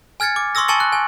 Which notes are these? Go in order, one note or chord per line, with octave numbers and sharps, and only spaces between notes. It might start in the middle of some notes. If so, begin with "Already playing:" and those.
G#5 F6 G#6 A6 C#7
D6
C6 C#6 D#6 E6 A#6
G#5 A5 C#6 A6 C#7 F#7
F#6
G#5